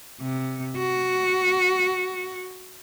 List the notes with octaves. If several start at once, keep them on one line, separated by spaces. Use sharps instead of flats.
C3
F#4